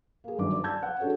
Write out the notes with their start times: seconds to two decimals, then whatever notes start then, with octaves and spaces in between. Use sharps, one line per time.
0.24 A#3 G#4
0.38 G1 F#2 D#3 D4 D6
0.52 D5
0.64 A5 E6 G6 G#6
0.83 F#5
1.00 D4 F#4 G#4 A4 C#5